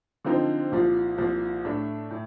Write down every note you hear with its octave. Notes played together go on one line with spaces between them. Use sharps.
D3 F3 C4 D#4
C2 A#2 F3
C2 A#2 F3
A2 A3 D4
A2